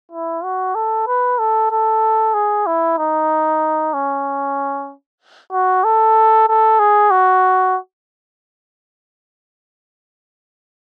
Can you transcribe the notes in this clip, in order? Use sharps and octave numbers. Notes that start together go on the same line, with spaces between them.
E4
F#4
A4
B4
A4
A4
G#4
E4
D#4
C#4
F#4
A4
A4
G#4
F#4